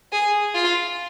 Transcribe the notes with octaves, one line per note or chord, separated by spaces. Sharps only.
G#4
F4